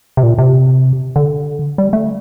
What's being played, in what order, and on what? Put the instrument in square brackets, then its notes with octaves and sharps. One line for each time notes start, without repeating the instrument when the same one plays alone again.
[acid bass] C3
A#2
C3
D3
G3
A3